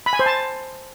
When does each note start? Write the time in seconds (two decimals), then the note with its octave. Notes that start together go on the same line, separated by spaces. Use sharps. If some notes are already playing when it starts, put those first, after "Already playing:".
0.06 B5
0.13 G#5
0.19 C5
0.26 A5